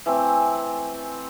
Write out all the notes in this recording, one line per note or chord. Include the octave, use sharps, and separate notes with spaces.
E3 A3 C4